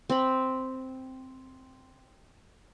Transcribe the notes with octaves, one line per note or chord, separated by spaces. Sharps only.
C4 B5